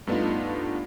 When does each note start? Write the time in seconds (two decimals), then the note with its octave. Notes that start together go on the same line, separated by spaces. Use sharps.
0.07 G2 A3 B3 D4 D#4 F4